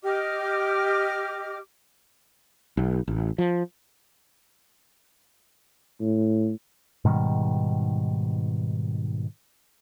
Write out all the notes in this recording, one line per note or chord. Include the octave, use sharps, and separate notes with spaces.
G4 D#5 D6 F6
B1
A1
F3
A2
G#2 B2 D#3 G3